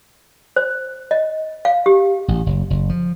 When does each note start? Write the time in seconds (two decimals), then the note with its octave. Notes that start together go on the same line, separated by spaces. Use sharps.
0.56 C5
1.11 D#5
1.65 F5
1.86 G4
2.28 A1
2.46 F#1
2.70 F#1
2.89 F3